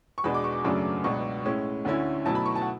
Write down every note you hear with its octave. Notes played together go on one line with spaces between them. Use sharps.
C#6
E2 B2 G#3 D4 B5
D6
C#6
F#2 C#3 F#3 A3 D4 D6
C#2 B2 F#3 B3 D4 C#6
A2 G#3 C#4 E4
D2 D3 A3 C#4 E4
B2 F#3 A3 E4 A5
B5
C#6
A5
F#5